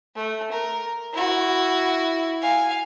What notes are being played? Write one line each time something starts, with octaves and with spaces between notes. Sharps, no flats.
A3
A#4
E4 F#4
F5 G#5